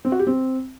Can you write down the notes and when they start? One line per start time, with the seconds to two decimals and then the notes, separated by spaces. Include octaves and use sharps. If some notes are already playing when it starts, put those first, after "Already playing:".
0.05 C4
0.12 F#4
0.19 G4
0.27 C4